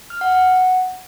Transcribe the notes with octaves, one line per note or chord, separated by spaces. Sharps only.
F6
F#5
F#5